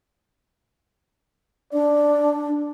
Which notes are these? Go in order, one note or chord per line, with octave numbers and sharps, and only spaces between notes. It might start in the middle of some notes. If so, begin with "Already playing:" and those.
D4 D5